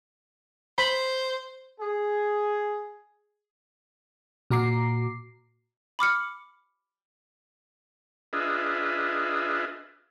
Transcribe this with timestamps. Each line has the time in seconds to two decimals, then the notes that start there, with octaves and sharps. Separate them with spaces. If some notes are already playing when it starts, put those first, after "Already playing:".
0.78 C5 B5
1.81 G#4
4.50 A#2 F#4 A#5 D6 C7
5.99 B5 D6 F6 C#7
8.33 D4 F4 G#4 B4 D#5 E5